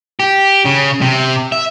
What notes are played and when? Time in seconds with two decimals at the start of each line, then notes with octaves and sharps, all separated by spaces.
0.20 G4
0.65 C#3
1.01 C3
1.52 E5